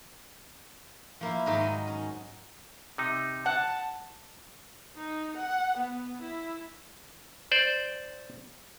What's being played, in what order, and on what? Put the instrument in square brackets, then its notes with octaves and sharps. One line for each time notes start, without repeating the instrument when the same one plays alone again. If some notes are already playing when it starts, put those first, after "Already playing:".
[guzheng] F3 A#3 E4
G#2 D#3 F#3 D#4 E5 A5
D#5
C#4
[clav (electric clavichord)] C3 D#4
[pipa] F#5 [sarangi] A5
[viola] D#4
F#5
B3
E4
[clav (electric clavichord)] C5 D5